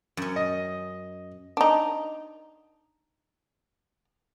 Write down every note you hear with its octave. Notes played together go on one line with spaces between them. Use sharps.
F#2 C#4
D#5
D4 D#4